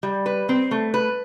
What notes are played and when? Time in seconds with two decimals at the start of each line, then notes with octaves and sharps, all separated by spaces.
0.03 G3
0.26 B4
0.49 C4
0.71 A3
0.94 B4